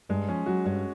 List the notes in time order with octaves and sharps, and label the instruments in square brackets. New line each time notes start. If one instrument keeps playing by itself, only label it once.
[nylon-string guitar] G2 G3 [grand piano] G#3
[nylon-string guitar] F3 [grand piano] C#4
[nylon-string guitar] F#3 [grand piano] F#4
[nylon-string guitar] G2 G3 [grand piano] C#4